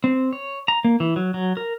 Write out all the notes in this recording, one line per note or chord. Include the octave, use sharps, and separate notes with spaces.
C4
C#5
A#5
A#3
E3
F#3
F#3
A#4